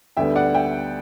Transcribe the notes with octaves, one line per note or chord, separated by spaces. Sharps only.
D2 D3 G3 B3 E5 G5
D5 F#5
E5 G5